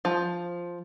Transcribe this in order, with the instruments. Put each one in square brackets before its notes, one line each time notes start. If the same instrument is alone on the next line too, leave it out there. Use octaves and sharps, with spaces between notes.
[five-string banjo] F3